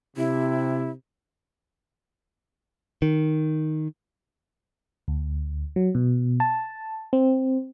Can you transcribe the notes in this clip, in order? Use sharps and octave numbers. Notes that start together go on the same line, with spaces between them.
C3 E4
D#3
D2
F#3
B2
A5
C4